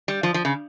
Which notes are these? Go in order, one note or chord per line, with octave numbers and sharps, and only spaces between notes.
G3
F3
F3
C#3